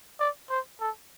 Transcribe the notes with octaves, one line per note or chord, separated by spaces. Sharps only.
D5
C5
A4